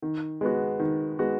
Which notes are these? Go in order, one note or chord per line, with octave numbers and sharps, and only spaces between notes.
D#3
G#3 B3 F#4
D#3
G#3 B3 F#4